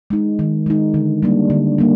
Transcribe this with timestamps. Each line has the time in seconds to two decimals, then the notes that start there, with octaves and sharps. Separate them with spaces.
0.10 G#3 D#4
0.39 D#3
0.66 G#3 D#4
0.94 D3
1.23 G3 A#3 D4
1.50 D3
1.78 G3 A#3